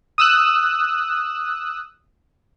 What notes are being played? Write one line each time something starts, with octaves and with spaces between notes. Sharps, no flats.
D#6 E6 F#6